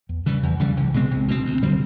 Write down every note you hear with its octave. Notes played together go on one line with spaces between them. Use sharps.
E2
C#3 E3 G3
E2
C#3 E3 G3
C2
B2 G#3 C4
C2
B2 G#3 C4
D2
D3 G3 C4